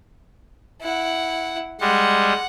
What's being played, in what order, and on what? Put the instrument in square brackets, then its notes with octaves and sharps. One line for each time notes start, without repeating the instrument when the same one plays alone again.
[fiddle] E4 F#5
[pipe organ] G3 G#3 [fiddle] F#5